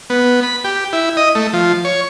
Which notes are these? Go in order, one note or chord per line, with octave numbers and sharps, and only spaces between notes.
B3
B5
G4
E4
D#5
A3
F3
C#5